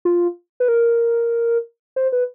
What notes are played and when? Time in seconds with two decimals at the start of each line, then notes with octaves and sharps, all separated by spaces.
0.05 F4
0.60 B4
0.68 A#4
1.96 C5
2.12 B4